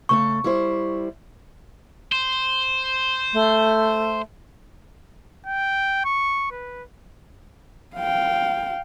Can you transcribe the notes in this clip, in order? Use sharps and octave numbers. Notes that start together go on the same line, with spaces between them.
C#3 A3 A4 C#6
G3 E4 C5
C5
A3
G5
C#6
B4
F5 G5